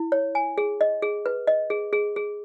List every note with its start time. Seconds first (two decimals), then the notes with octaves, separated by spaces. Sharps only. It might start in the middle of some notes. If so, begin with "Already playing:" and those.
Already playing: E4
0.12 C#5
0.35 G#5
0.58 G#4
0.81 D#5
1.02 G#4
1.26 B4
1.47 D#5
1.70 G#4
1.93 G#4
2.16 G#4